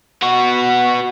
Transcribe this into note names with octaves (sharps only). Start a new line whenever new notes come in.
B3 F#4